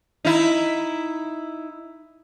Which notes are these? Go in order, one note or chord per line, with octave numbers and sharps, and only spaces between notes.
D#4 E4